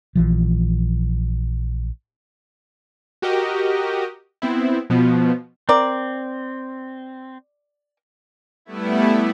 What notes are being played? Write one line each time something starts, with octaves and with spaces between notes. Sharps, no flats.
A#1 E3 F3
F#4 G4 A#4 D#5
B3 C4 E4
B2 F3 B3
C4 A#4 D5
G3 A3 B3 E4